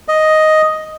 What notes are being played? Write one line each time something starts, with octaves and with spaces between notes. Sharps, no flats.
D#5